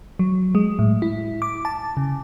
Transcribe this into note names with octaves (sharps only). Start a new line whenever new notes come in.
F#3
G#3
A2
E4
D6
A5
C#3